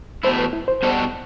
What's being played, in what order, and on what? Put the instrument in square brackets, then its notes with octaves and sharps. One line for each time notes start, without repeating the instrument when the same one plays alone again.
[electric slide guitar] E2 B2 A3 E4 [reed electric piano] C5
[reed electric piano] B4
E4
C5
[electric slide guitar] B2 G3 D4 F#4 A4